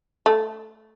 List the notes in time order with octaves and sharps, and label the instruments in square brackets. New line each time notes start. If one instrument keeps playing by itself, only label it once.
[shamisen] A3